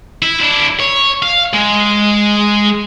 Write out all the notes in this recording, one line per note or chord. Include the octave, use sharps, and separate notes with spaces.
E4
D4 E4
C#5
F5
G#3